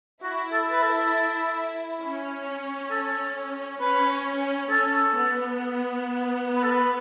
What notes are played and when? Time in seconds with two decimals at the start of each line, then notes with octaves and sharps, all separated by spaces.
0.23 E4 F#4
0.53 A4
0.72 B4
0.83 A4
2.02 C#4
2.91 A4
3.81 C#4 B4
4.69 C#4 A4
5.14 B3
6.56 B4
6.63 A4
6.71 B4